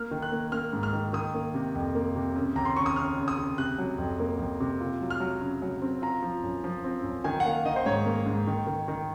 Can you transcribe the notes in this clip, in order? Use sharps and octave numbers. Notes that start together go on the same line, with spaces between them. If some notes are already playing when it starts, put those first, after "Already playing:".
Already playing: A#3 F6
D#3
F#6
A#3
A#3 F6
G#2
F6
D#3
D#3 D#6
A#3
C3
F2
A#3
C3
C#3
D#2 A#5
C6
C#3 C#6
D#6
C#3 F6
C#3
D#6
C#3
C3 F#6
F#3
F2
A#3
F2
C3
F4
F#3
F6
F#3
C#3
F#3
C4
F4 A#5
F3
F#2
F3
C4
F#2
D#3 G#5
F#5
A#3 F5
D#3 D#5
C5
G#2 C#5
A#3
G#2
D#3
D#3
D#3